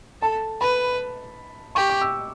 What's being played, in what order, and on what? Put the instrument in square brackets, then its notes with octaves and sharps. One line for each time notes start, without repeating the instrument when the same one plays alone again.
[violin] A4 [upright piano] A5
[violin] B4 [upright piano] B5
[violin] G4 [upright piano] C#6
[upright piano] D6
E6